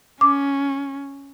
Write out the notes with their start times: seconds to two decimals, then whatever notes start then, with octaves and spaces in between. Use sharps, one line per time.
0.21 C#4 D6